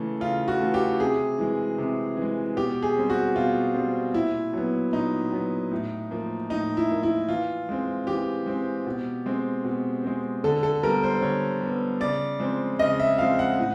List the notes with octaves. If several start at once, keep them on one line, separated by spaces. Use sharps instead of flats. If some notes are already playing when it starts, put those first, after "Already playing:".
Already playing: C#3 E3 A3 E4
C#3 F4
F#4
E3 A3
G4
C3 G#4
E3 G#3
C3
E3 G#3
B2 G4
G#4
G3 C4
F#4
B2 F4
G3 C4
A#2 E4
F#3 B3
A#2 D#4
F#3 B3
A2
F3 A#3
A2 D#4
E4
F3 A#3
E4
E3 F4
G#3 C4
E3 G4
G#3 C4
B2
G#3 C4
B2
G#3 C4
D3 A4
A4
G3 B3 A#4
C5
D3 C#5
G3 B3
C#3 D5
F3 G#3 C4
C#3 D#5
E5
F3 G#3 C4 F5
F#5
A2